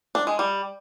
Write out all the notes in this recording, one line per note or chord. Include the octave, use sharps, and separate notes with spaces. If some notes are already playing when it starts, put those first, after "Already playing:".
D4
G#3
G3